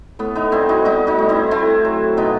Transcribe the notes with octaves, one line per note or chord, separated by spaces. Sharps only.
A2 B3
B3 D#4
G3 C4 E4
D#4 F#4
G3 B3 D#4
D#4 F#4
A2
C4 E4
A3 C4 E4
F#3
B2 B3 D#4